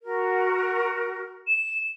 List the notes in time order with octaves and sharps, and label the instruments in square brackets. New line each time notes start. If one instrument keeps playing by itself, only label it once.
[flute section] F#4 A#4
[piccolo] E7